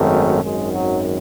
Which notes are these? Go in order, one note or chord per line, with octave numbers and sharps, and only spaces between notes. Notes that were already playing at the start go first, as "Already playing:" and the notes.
Already playing: G#1 F#2 D#3 A3
G#1 F#2 D#3 G#3
F#3